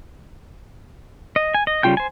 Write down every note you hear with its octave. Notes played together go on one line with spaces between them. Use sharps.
D#5
G#5
D#5
C#3 G3 F4 G5 G6
C5 G#5